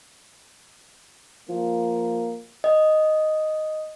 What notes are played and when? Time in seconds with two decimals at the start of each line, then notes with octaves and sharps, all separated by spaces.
1.49 F3 A#3
2.64 D#5